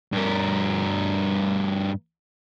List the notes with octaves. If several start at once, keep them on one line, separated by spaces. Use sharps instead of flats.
G2 A#4